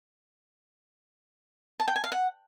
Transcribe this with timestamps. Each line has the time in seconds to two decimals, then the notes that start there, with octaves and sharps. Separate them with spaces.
1.80 A5
1.88 G5
1.96 G#5
2.04 F5
2.12 F#5